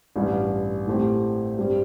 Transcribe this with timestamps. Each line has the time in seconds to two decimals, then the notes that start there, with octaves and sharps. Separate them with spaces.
0.16 A1 G2 G3
0.87 A2 A3 C4 G4 C5
1.58 G2 G3 C4 G4